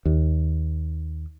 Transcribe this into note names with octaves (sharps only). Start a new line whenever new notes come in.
D#2